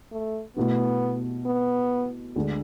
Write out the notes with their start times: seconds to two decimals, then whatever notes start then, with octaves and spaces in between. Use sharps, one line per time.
0.11 A3
0.57 B2 A3 B3 E4
1.46 B3
2.36 D2 D3 G#3 D4 G#4